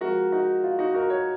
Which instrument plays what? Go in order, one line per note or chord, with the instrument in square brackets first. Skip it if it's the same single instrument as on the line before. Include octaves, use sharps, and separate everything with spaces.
[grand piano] F3 G#3 C4 F#4 A#4
D#4 F#4
F4
D#4 F#4
F#4 A#4
A#4 C#5